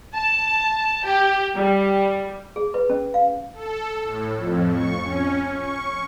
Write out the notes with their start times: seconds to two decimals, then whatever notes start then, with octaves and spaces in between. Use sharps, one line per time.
0.14 A5
1.05 G4
1.55 G3
2.56 G#4
2.74 B4
2.90 C#4
3.14 F5
3.53 A4
4.04 A2
4.37 F2
4.70 C#6
5.02 C#4
5.55 C#6